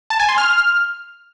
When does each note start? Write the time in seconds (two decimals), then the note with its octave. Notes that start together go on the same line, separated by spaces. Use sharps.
0.10 A5
0.19 G#5
0.29 C6
0.38 F6